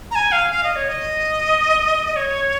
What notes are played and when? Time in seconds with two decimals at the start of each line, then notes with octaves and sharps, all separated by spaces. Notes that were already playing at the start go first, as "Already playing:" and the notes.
0.11 A#5
0.15 G#5
0.32 F5
0.51 F5
0.63 D#5
0.76 C#5
0.88 D#5
2.12 D#5
2.16 C#5